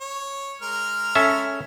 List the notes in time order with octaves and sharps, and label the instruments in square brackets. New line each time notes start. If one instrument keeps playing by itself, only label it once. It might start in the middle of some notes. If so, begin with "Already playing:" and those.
[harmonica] C#5
G#3 A#4 F6
[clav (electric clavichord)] C#4 A4 E5